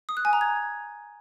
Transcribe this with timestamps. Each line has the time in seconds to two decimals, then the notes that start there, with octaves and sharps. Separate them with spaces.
0.09 D#6
0.17 F#6
0.25 G#5
0.33 A#5
0.41 G#6